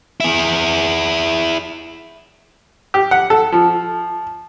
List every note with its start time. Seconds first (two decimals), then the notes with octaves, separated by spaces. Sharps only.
0.20 E4 G#4
2.94 G4
3.11 F#5
3.30 A4
3.52 F3